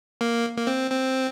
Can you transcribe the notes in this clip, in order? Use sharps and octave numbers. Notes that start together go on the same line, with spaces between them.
A#3
A#3
C4
C4